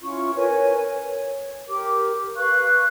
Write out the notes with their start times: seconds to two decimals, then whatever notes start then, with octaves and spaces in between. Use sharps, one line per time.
0.02 C#4 E4 F4 C#6
0.35 A#4 B4 C#5 G#5
1.03 C#5
1.68 G4 A#4 D6
2.36 B4 F5 C#6 F#6